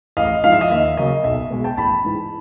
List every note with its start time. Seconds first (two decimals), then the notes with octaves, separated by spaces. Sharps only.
0.17 A1 D#5 F5
0.44 G#2 F3 F5
0.52 E5
0.61 D#5 F5
0.70 D#2 E5
0.97 C#3 F#3 A#3 D#5
1.24 B1 E5
1.50 B2 G#3
1.64 G5 A5
1.77 A1 A5 B5
2.04 G#2 E3